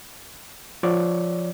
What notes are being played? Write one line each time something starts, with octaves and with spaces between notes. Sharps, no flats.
F3 C#5 D5